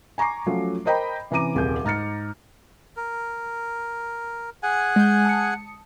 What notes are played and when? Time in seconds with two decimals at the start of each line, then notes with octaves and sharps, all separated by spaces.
0.18 G#5 A#5 C#6 D6 C7
0.46 F3 F#3 A3 C#4
0.85 A#4 C5 D#5 G5 A#5 B5
1.31 C3 E3 C#4 A#5 D6 D#7
1.55 D#1 C2 G#4 G6
1.85 G#2 A#5 F6 A6 C#7
2.97 A#4
4.63 G#4 F#5 G#5
4.96 G#3 G6
5.25 A5 D#6 C#7